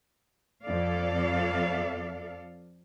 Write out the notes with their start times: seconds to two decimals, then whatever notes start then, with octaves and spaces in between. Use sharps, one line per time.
0.64 F2 A4 D5 F5